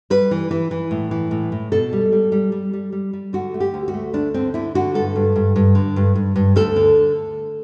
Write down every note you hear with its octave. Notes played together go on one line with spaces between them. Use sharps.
G3 B4
E3
E3
E3
A2
E3
A2
A2
B2 A4
G3
G3
G3
G3
G3
G3
G3
D3 F#4
A3
G4
D2
F#4
A3
D2 D4
D3 C4
D3 E4
D3 F#4
G2 A4
G2
G2
G2
D3
G2
G2
G2
D2 A4
D3